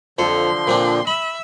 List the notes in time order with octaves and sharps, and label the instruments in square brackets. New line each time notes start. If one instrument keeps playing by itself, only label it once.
[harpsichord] F2 A4 [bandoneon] D3 F3 [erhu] C6
[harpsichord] A#2 C4 D4
[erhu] E5 [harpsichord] B5